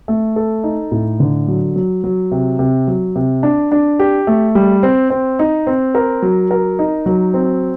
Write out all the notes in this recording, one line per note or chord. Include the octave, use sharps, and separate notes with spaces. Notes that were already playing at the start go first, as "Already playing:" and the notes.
A3
A4
D#4
A2
D3
F#3
F#3
F#3
C3
C3
F#3
C3
D4
D4
G4
A3
G3
C4
C4
D#4
C4
A#4
F#3
A#4
D#4
F#3
C4